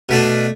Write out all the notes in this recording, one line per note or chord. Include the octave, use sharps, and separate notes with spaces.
B2 A3 D4